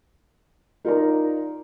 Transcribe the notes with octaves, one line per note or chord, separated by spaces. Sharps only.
D#4 F4 A#4 D5 A#5